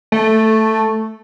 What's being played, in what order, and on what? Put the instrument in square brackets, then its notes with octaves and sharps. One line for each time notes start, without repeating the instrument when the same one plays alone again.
[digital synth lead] A3